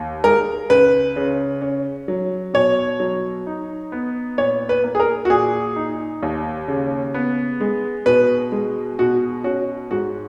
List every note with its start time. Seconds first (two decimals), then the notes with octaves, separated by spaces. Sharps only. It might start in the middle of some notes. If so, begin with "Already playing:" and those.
Already playing: D#2
0.24 G#3 A#4
0.70 C#2 B4
1.16 C#3
1.61 C#4
2.08 F#3
2.54 B2 C#5
3.00 F#3
3.46 D#4
3.92 B3
4.38 A#2 C#5
4.69 B4
4.84 A#3
4.95 G#4
5.00 A#4
5.25 F#4
5.30 A#2 G#4
5.76 D#4
6.22 D#2
6.68 C#3
7.14 B3
7.60 G#3
8.06 B2 B4
8.52 G#3
8.99 B2 F#4
9.44 C#4 F#4
9.91 G#2 F#4